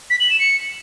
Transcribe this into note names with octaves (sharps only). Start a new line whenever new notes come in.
B6
F#7
E7
C#7